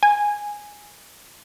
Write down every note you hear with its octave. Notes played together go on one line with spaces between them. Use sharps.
G#5